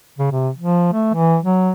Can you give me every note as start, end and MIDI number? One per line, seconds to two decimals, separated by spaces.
0.19 0.31 49
0.32 0.49 48
0.58 0.92 53
0.93 1.09 57
1.14 1.37 52
1.43 1.72 54